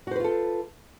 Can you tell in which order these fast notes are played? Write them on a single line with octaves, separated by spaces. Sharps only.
F#4 C5 B4 F4 A4